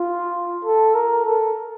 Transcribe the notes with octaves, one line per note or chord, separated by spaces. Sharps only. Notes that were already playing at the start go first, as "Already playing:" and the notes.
Already playing: F4
A4
A#4
A4